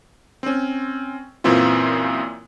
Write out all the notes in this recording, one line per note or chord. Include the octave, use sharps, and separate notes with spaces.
C4 C#4
F#2 A#2 E3 C4 E4 F4